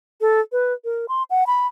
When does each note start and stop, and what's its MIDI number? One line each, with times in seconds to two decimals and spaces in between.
0.21 0.40 69
0.52 0.73 71
0.85 1.06 70
1.08 1.23 84
1.30 1.47 78
1.47 1.67 83